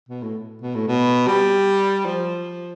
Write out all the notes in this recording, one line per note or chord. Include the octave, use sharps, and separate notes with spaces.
B2
A2
B2
A2
B2
G3
F3